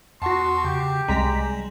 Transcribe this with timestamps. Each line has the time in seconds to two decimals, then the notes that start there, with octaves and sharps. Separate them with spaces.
0.22 E2 F#4 F#5 A5 C6 C#6
0.64 C#3 G4
1.08 C2 G3 G#3 A#5 B6